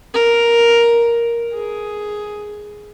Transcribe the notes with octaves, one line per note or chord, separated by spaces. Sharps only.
A#4
G#4